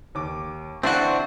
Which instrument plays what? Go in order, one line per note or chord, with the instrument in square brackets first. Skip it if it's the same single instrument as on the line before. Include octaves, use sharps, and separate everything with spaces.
[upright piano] D#2 D6
[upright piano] D3 E3 E4 [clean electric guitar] C4 D4 F#4 [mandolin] C5 F#5